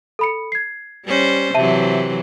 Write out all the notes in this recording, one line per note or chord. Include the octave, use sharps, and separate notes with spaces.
A4 B5 C#7
G#6 C7
G3 C#4 C5
C3 E3 F#3 E5 A5 D#7